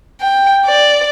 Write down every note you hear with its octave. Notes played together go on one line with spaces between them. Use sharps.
G5
D5